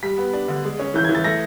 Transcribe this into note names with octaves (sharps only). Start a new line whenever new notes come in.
G3 B6
B3
D4
D3
G#3
C#4
E3 G6
E3 G#6
A6
A3 A#6